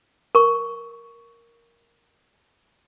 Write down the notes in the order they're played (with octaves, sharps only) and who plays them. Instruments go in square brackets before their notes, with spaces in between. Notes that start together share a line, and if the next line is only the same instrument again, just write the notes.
[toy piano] A#4 C#6